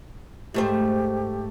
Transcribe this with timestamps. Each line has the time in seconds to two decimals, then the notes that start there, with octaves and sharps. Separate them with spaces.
0.54 G#2 A3 G4 C5